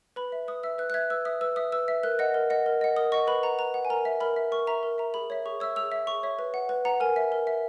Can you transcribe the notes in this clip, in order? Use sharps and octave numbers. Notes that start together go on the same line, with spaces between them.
B4 B5
E5
B4 D#6
E5 E6
B4 F#6
F#6
E5 G#6
B4 E6
E5 D#6
B4 E6
E5 D#6
B4 E6
E5
A#4 F#6
D#5 F#5
A#4
D#5 F#5
A#4
D#5 F#5
A#4 D#6
D#5 F#5 C#6
B4 B5
F#5 A#5
B4 A#5
F#5
G#5
A#4 A#5
E5
A#4 B5
E5
A#4 C#6
E5 A#5
A#4
E5 A#5
G#4 B5
C#5 E5
G#4 C#6
C#5 E5 E6
G#4 E6
C#5 E5
G#4 C#6
C#5 E5
B4
F#5
B4
F#5 A#5
A#4 G#5
E5
A#4
E5